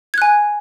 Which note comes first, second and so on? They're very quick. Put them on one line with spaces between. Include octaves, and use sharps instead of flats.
G#6 F#6 G#5